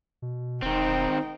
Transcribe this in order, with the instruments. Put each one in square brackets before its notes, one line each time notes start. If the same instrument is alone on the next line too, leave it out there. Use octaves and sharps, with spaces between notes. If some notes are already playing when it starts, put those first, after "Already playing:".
[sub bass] B2
[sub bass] E1 [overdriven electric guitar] D#3 C4 [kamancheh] D#4 G5